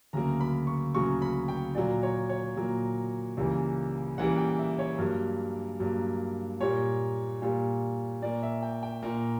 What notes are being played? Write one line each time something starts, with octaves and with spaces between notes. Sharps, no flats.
D2 C#3 F#3 A#3 A#5
B5
C#6
D2 C#3 F#3 A#3 C#6
B5
G5
A#2 F#3 A#3 D5
C#5
C#5
A#2 F#3 A#3
C#2 C#3 E3 G3 A#3
C#2 C#3 E3 G3 A#3 F#5
G5
E5
C#5
G2 F#3 A#3 A#4
G2 F#3 A#3
A#2 G3 A#3 C#5
A#2 G3 A#3
A#2 A#3 D5
E5
G5
G5
A#2 A#3 A#5